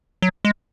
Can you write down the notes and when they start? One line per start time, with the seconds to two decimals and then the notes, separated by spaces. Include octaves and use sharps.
0.22 F#3
0.45 G#3